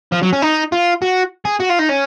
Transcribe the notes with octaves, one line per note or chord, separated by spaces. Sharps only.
F3
F#3
C#4
D#4
F4
F#4
G#4
F#4
F4
D#4
C#4